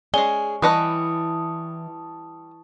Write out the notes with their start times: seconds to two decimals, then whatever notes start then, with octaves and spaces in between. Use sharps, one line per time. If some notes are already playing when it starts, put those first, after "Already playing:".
0.14 G#3 C#4 G#4 D5 G#5 G7
0.62 E3 G3 B4 D#5 A5 C#6 D#6